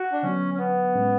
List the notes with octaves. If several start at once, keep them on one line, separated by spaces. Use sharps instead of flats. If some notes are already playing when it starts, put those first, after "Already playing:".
Already playing: F#4
D4
D3 F#3 B3 C#4
C#4
B3
A2 G#3 C#4